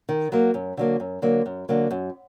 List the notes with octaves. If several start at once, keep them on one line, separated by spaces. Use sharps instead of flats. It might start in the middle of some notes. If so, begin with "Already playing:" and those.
D#3
F#3 A#3
F#2
D3 F#3 A#3
F#2
D3 F#3 A#3
F#2
D3 F#3 A#3
F#2